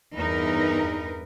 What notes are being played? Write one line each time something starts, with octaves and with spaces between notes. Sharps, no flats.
E2 G2 D#4 A#4 B4